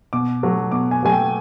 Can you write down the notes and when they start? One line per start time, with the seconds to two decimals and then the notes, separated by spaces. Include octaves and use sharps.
0.13 B2 D6
0.43 F#3 A3
0.72 B2 D6
0.91 G#5
1.02 F#3 A3 G#5
1.12 G5